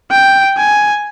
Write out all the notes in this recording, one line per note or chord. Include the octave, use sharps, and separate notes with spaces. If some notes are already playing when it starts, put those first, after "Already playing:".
G5
G#5